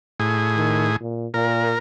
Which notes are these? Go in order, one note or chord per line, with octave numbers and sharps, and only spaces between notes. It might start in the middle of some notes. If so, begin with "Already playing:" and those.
A2 G#4
D#3
A#2
A#2 A#4